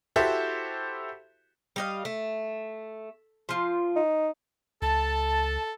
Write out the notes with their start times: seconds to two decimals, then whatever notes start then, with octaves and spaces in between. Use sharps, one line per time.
0.16 E4 F#4 G4 A4 C5 E5
1.76 G3 D#5 F5
2.05 A3
3.49 F3 F4
3.96 D#4
4.82 C#2 A4 A5